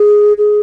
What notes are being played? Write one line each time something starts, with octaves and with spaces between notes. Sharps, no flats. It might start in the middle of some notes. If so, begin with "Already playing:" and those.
Already playing: G#4
G#4